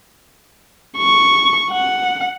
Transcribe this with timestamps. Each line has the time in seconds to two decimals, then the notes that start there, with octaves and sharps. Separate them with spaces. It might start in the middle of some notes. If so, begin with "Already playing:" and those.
0.98 C#6
1.71 F#5